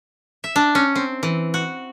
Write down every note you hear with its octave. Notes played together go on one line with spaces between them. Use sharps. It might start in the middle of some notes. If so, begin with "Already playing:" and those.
E5
D4
C#4
C4
E3
F#4